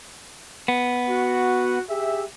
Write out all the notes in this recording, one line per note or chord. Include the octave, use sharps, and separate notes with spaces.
B3
F#4
G4 G#4 E5